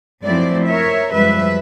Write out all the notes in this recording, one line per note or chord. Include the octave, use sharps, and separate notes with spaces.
F#2 F3 A3 C4 E4 D5
A#4 C#5 E5
F#2 F3 G3 G#3 B4 E5